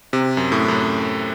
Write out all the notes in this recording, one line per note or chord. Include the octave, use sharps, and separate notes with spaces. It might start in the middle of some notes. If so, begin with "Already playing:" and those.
C3
F#2
A2
F#2